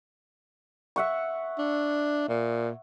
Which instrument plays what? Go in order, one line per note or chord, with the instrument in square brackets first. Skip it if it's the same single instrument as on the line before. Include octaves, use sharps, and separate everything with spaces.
[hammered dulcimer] E5 F#5 C#6
[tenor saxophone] D4
A#2